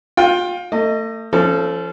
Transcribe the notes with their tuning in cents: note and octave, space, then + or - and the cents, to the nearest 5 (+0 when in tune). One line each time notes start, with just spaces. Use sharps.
F4 +30 G5 +5
A3 +35 D#5 +0
F3 -30 C#4 +0 A4 +0